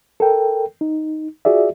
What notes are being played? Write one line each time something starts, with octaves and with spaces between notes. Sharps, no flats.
A4 A#4 G5
D#4
F4 F#4 G#4 D5 E5